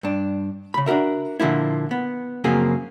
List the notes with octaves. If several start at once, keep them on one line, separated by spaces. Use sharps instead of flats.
G2 D4
C#3 B5
D4 F#4 G4 A#4 E5
A#2 D3 F3 A#3 E4
B3
F#2 C#3 F3 A#3 C4 G#4